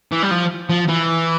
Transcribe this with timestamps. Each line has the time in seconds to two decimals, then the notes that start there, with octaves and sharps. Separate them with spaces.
0.12 E3
0.23 G3
0.31 F3
0.69 F3
0.88 E3